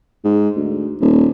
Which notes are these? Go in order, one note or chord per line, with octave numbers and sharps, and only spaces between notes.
G#2
D2
D#1